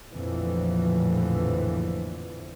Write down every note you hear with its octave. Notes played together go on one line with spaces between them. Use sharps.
A#1 F2 A2 D3 E3 F3